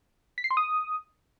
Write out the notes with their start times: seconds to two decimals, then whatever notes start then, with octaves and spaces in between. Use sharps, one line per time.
0.38 B6
0.44 C7
0.51 C6
0.57 D#6